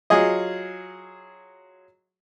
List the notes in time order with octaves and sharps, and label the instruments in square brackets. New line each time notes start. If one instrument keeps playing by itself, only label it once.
[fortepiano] F#3 F4 G#4 D#5